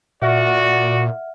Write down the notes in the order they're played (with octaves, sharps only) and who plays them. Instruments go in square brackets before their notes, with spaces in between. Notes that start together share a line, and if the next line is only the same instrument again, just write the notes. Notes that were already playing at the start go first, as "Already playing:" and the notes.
[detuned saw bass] A#2 [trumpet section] F#4 D5 [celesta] E5 F#5 F6